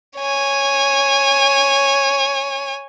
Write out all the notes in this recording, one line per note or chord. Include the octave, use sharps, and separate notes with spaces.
C#5 G#5